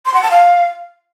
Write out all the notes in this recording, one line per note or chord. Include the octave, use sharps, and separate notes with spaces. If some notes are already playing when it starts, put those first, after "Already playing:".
C6
F#5
A5
F5